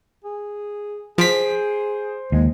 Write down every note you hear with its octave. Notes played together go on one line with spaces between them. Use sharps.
G#4
F3 G#4 C5 B6 D7
D#2 G#3